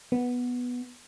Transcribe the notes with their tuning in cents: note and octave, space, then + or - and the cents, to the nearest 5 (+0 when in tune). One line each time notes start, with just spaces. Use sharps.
B3 -5